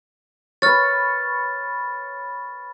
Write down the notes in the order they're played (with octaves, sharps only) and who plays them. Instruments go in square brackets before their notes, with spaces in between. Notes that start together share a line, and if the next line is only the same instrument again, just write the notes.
[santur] B4 C#5 [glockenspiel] F6 A6